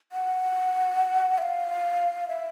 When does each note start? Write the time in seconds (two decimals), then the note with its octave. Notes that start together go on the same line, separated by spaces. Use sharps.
0.12 F#5
1.38 E5
1.42 F5
2.29 E5